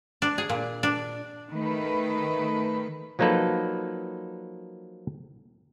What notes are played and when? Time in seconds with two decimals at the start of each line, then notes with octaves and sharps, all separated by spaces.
0.22 D4
0.38 G#4
0.50 A#2
0.83 D4
1.50 D#3 A3 B4
3.19 F3 F#3 A#3 D#4 A4 B4